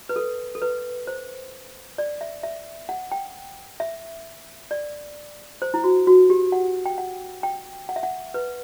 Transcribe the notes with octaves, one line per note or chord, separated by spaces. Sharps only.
B4
A4
A4
B4
C5
D5
E5
E5
F#5
G5
E5
D5
C5
E4
F#4
F#4
G4
F#5
G5
F#5
G5
F#5
E5
F#5
B4